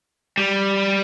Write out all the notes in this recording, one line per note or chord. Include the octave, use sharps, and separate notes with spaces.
G3